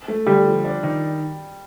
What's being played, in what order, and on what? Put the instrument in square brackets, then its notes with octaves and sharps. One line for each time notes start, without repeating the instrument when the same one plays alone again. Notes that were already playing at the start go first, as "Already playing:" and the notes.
[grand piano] A3
[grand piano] D3 [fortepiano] G3
[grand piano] F3
D4
D#3